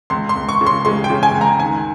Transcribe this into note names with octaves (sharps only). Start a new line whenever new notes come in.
C#2 C6
C6
C#2
C#6
C#3
C6
G#3 C6
G5
C#3
G#5
C#2
A#5
D#3 G#5